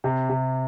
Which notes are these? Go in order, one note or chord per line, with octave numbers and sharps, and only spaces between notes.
C3
C3